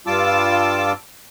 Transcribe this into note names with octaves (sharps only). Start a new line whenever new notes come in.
G2 G3 F4 A5 D6 E6